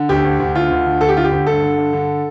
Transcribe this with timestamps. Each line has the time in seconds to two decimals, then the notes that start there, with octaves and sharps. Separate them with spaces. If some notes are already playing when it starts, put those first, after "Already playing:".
Already playing: D3
0.09 D2 G4
0.24 D2
0.40 D2
0.55 D3 F4
0.71 D2
0.86 D3
1.01 D2 A4
1.09 G4
1.16 D3 F4
1.24 G4
1.31 D2
1.47 G2 A4
1.63 D3
1.77 G2
1.93 D3